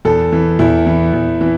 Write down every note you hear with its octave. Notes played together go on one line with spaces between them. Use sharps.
E2 A4
E3
E2 E4
E3
E2
E3